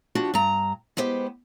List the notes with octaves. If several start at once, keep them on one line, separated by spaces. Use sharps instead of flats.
F3 D4 F#4 G4
G2 A#5
G#3 B3 G4 C5